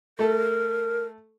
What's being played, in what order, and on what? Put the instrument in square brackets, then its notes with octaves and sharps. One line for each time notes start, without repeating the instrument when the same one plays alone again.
[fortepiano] A3 A4 [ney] A#4